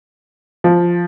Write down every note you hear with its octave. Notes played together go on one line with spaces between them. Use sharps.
F3